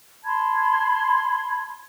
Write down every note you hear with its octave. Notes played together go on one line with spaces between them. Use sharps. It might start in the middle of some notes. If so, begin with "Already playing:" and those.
A5 B5 C6 G#6